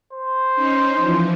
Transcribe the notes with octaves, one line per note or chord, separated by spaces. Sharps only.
C5
C#4 D#4
E3 F3